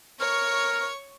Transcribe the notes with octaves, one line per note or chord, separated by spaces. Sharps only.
A#4 C#5 C#6